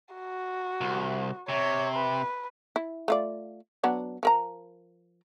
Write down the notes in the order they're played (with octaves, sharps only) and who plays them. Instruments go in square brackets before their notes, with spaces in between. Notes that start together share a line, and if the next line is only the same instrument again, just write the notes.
[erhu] F#4
[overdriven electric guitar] C2
[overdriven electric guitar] C3 [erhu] C#5
[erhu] B4
[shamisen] E4
A3 F4 D5
F#3 B3 D4
F3 A#4 A#5